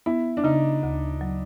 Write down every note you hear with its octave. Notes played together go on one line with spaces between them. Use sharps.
B3 E4
D4
C#3 D#4
D2
F#3